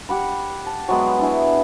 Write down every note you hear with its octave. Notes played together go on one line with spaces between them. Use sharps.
G4 F#5 B5
A5
F#3 G#3 B3
D4 E4 G#4